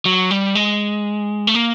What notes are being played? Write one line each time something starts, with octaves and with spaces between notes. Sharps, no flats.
F#3
G3
G#3
A3
A#3